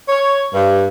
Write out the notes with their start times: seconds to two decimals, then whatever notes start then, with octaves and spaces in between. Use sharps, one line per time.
0.09 C#5
0.54 G2